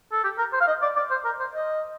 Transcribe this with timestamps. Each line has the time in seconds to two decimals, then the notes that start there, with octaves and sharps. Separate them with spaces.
0.12 A4
0.24 G4
0.38 A#4
0.53 C5
0.61 F5
0.67 D#5
0.82 D5
0.96 D5
1.11 C5
1.25 A#4
1.40 C5
1.55 D#5